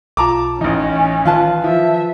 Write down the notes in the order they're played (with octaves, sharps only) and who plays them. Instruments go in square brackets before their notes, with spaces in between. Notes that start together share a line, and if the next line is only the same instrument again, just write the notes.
[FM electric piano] B1 F4 [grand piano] A5 A#5 D6
[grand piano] A1 D#4 [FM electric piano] E3 A#6 [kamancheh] C#4
[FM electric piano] D#3 E3 [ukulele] F4 B4 A5
[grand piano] F3 [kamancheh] E5